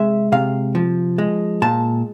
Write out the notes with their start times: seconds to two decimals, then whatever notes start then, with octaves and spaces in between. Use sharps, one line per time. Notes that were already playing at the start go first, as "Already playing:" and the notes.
Already playing: C3 G#3 E5
0.32 C3 F5
0.75 F3
1.18 G#3
1.62 A#2 A5